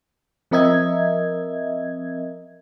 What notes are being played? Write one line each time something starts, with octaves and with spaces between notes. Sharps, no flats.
F3 C4 A#4 D#5 E5 G#6